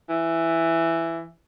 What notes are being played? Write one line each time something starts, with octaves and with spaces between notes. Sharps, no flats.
E3